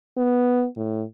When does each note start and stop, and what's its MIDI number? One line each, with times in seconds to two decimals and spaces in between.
0.17 0.67 59
0.76 1.04 45